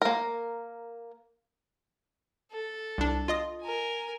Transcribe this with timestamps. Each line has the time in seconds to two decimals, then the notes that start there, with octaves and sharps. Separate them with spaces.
0.02 A#3 A#4
2.52 A4
2.98 C2 D4
3.28 F4 D#5 D#6
3.61 A#4 G#5